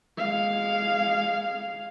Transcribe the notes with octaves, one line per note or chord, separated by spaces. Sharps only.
G#3 F5